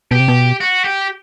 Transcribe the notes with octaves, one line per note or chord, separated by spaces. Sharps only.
B2 G4
C3
B2
F#4
G4